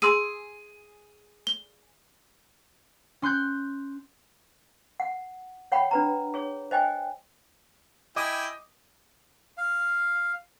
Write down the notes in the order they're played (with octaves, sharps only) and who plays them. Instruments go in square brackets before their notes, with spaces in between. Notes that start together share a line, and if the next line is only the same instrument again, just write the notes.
[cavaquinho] G#4 [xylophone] C6 E6 D#7
[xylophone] G7
[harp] C#4 C6 F#6 G6
[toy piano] F#5
C#5 F#5 G5 B5
D4 B4 A#5
G#4 C#5
C5 D#5 G5 G#5
[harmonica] E4 G5 G#5 [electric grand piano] D#5 D6 D#6
[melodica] F5